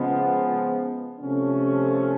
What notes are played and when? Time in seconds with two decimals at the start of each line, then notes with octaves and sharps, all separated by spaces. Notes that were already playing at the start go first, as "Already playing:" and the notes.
Already playing: C#3 F3 G#3 B3
1.21 C3 F3 A3 C#4